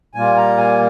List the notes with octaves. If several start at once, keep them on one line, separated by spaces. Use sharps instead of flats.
A#2 G3 A#3 F4 G#5
A#5
G#5